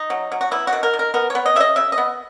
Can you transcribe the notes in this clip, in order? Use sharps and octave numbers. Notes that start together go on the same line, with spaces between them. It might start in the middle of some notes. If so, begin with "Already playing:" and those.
Already playing: D#4
F#3
F#3
F#4
B3 E4
F#4
D#3
A#4
D#3
A#4
B3 A#4
C#5
B3
D#5
C#3 D#5 E5
C#3 E5
D#5
B3